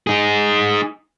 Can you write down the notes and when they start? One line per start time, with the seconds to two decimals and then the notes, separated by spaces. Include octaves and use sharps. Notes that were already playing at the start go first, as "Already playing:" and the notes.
0.07 D#4 G#4